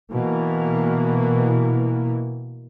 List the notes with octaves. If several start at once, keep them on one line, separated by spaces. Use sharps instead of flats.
B2 E3 A#3